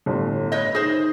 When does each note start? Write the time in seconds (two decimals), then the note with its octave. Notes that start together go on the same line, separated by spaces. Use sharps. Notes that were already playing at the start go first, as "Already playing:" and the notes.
0.06 G1 A2 C6
0.52 B4 C#5 D#5 G6
0.75 D#3 G#4 C5 G6 A#6